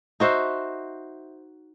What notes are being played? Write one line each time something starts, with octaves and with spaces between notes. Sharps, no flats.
D#4 F#4 C5 E5